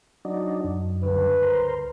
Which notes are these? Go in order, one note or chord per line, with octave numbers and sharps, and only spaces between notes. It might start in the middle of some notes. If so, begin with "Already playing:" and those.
F#3 D4 D#4
F#2
C#2 G2 D3 B4
A#4 C5